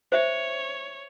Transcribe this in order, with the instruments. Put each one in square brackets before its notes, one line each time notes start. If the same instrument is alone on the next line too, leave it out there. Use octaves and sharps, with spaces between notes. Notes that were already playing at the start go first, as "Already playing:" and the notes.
[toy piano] C5 E5 [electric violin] C#5